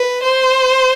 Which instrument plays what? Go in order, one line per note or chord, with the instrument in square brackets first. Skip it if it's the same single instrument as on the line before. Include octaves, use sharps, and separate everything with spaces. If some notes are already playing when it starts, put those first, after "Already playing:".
Already playing: [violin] B4
C5